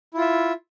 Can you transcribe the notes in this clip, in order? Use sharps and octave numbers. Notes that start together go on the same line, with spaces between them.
E4 F4 E5